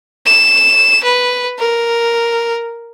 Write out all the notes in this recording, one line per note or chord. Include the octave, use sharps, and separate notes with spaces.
E7
B4
A#4